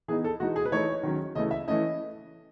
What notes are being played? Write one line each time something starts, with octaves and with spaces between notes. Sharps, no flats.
E3 B3 D#4 G#4
A4
E3 G#3 D#4 F#4
G#4
B4
E3 A3 D#4 C#5
D#3 F#3 C#4
C#3 E3 A3 D#5
E5
E3 A3 C#4 D#5